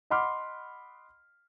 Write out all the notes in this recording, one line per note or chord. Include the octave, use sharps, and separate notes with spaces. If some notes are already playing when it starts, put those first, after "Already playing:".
D#5 F#5 B5 C6 D6 F6